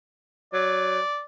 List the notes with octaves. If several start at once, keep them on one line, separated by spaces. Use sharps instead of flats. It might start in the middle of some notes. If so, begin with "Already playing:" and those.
F#3 D5